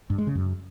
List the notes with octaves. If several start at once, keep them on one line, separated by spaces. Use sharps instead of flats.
G2
G#3
C#3
F#2